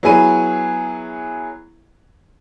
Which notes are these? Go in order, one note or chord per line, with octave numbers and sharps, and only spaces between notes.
F#3 B3 E4 G#4 B5 D#7